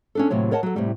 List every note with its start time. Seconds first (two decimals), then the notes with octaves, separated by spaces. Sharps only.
0.15 C#4 D4 A4
0.30 D#2 A2 C3 F#3 C#5
0.51 A#4 C#5 D#5 F#5 A5
0.63 F#3 A4
0.76 A2 C3 G3